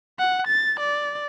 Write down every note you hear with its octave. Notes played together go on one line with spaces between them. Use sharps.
F#5
A6
D5